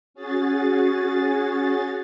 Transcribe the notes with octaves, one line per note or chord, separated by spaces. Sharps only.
C#4 F#4 G#4 A6